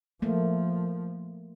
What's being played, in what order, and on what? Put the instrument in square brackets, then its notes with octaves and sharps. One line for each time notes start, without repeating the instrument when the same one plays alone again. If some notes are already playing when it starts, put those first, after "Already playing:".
[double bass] F3 [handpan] A3 A#3